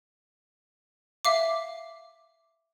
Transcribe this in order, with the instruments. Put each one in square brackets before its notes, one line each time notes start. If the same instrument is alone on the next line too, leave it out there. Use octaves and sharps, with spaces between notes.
[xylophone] E5 F5 D6